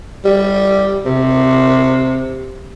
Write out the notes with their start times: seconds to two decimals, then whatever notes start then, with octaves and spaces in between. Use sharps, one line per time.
0.25 G3
1.05 C3